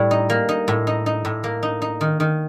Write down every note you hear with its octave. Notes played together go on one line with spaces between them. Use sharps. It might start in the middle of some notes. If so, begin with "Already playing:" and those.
Already playing: A2 G3
D#4
A#3
D#4
A2
D#4
D#4
A2
A#3
D#4
D#4
D#3
D#3